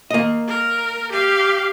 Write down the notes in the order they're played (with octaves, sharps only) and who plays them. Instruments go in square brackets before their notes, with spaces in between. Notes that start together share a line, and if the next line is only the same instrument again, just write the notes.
[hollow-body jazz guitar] A#3 D#5
[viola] A#4
G4 F5